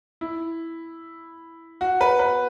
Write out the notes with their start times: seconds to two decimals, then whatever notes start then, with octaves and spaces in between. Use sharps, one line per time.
0.21 E4
1.81 F#4
2.01 B4
2.19 B4